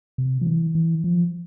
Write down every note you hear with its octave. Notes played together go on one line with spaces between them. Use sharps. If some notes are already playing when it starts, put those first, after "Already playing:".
C3
F3
E3
E3
F3